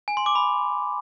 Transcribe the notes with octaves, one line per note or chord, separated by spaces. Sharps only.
G#5
C6
D6
B5